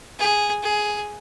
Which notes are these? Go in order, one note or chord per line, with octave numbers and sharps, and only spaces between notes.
G#4
G#4